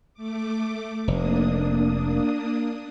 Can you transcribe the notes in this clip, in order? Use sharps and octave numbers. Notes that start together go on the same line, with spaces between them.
A3 D6
F1 A#3 D4 D#6